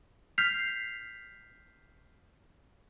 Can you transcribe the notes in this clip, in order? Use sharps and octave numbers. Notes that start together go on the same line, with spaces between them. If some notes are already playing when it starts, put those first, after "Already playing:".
F6 G6 B6 C7 F7